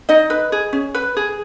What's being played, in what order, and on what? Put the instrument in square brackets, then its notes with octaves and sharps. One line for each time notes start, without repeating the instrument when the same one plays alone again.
[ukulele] D#4 D#5
B4
G#4
C#4
B4
G#4